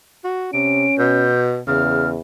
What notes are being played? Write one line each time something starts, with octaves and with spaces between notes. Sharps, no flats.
F#4
C3 C#4 D7
B2 G6
E2 C#3 F6